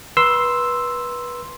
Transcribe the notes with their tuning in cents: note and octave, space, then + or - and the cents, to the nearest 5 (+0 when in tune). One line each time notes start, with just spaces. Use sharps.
B4 -25 C6 +0 E6 +0